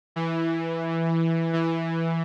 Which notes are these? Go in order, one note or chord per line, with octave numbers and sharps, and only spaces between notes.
E3
E3